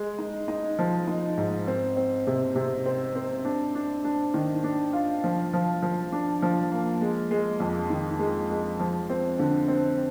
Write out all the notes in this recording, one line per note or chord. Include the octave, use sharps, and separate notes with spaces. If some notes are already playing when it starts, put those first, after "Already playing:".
Already playing: G#3
D#4
D#4
F3
D#4
G#2
C4
C4
C3
C3
C4
C4
D4
D4
D4
D#3
D4
F4
F3
F3
F3
D4
F3
A#3
G#3
G#3
F2
D#3
G#3
G#3
F3
C4
D3
C4